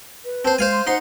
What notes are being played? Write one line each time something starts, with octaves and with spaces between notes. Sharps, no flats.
B4
C4 C5 A5
G#3 C5 F5 G#5
C6
D#4 C5 F#5 C6